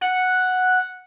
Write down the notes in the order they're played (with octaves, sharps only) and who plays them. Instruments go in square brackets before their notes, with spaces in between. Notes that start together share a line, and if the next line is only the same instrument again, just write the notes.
[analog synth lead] F#5